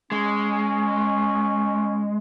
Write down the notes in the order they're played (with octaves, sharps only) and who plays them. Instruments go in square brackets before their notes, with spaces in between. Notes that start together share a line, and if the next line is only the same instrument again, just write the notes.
[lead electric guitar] G#3 [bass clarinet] C#4